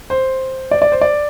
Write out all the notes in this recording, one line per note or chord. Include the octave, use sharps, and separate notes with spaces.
C5
D5
D5
C5
D5